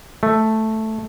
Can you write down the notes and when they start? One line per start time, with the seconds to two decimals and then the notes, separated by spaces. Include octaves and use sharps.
0.23 A3